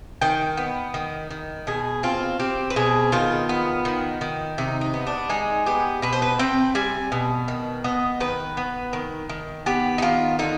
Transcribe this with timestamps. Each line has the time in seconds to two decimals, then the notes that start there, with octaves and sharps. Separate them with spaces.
0.21 D#3 G5
0.57 B3
0.94 D#3
1.31 D#3
1.67 B2 G#4
2.03 C4 F4
2.40 C4 G4
2.70 B4
2.76 B2 G#4
3.12 D#3 F4
3.49 B3
3.85 D#3
4.21 D#3
4.58 C3 D#4
4.81 D#4
4.94 B3
5.07 D4
5.30 G#3 D#4
5.66 B3 G4
6.02 B2 B4
6.13 C5
6.22 B4
6.39 C4 G5
6.75 G3 G#5
7.12 B2
7.48 D#3
7.84 B3 D#5
8.20 D#3 B4
8.57 B3
8.93 D#3
9.29 D#3
9.66 B3 G4
9.98 D#4
10.02 D#3 F4
10.39 D3 D#4